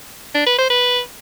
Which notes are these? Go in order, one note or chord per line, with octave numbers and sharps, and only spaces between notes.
D4
B4
C5
B4